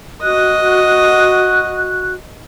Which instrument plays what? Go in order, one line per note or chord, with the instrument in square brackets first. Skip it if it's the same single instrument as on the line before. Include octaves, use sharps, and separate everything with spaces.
[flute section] F#4 F#6 [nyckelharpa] D#5